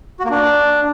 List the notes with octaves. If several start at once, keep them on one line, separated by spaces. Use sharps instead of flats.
F#4
A#3
D4